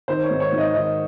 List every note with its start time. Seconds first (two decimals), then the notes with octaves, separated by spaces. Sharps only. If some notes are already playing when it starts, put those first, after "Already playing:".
0.08 D#3 C5
0.24 C#5
0.30 G#2
0.40 C#5
0.52 G#2
0.58 D#5
0.74 D#3 D#5